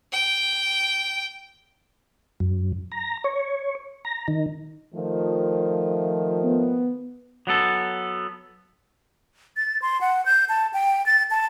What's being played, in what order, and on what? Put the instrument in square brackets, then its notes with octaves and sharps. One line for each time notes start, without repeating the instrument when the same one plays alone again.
[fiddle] G5
[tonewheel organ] F#2
A#5
C#5
A#5
D#3
[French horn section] D#3 F3 A3
[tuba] B3
[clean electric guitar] F#3 B3 A4
[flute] A6
C6
F#5
G6
A5
G5
A6
A5